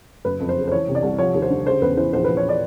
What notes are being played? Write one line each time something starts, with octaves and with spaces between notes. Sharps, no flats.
F#1 B4
F2
C5
C#3
C5
E3 C#5
C3
D5
C2
F3 C#5
D#2
C5
D3
C#3 C5
E2 B4
E3 C5
A#1 C5
A#1 B4
C#5
D5